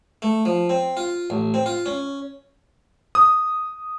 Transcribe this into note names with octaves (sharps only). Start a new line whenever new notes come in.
A3
F3
C4
F4
A1
C4
F4
C#4
D#6